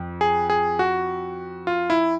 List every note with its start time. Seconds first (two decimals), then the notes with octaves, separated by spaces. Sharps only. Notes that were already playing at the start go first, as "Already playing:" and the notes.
Already playing: F2
0.21 G#4
0.50 G#4
0.79 F#4
1.67 F4
1.90 E4